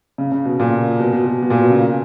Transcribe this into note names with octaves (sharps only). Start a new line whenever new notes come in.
C#3
C#3
B2
A#2
B2
B2
B2
B2
A#2
B2
C#3